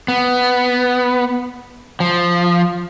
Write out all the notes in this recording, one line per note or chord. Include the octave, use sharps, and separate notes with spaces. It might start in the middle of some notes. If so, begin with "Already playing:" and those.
B3
F3